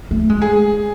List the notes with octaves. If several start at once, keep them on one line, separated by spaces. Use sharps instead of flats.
A3
G#3
G#4